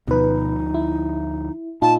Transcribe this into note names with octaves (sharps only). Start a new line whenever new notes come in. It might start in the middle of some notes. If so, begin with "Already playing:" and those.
D2 B2 F3 D#4 B4
E4
A#2 D#4 F4 A5